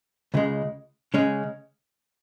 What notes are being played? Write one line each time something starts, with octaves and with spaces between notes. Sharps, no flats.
C#2 C#3 G#3
C#3 G#3 C#4